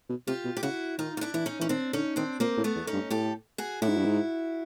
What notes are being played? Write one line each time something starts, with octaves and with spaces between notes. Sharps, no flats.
B2
C3 F4 G4
B2
G4
C#3 E4 F#4
D#3 D#4 F4
F4
D4 E4
E3 E4
C#4 D#4
E3 C#4
D#3 C4 D4
D3 C#4 D#4
D#3 C4 D4
A#2 A#3 C4
A2
A3 B3
E2
C#4 D#4
G2
A2 G4 A4
F#4 G#4
A2 E4 F#4
G#2
G2
G#2